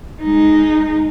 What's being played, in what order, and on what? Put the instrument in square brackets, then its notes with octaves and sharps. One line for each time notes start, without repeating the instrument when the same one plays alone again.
[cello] G#3 D#4